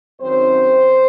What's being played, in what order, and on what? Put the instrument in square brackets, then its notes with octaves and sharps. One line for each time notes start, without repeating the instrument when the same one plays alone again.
[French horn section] F#2 D#3 F#3 C4 C5